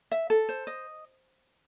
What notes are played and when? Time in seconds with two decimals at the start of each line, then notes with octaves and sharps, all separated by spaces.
0.11 E5
0.30 A4
0.49 C5
0.67 D#5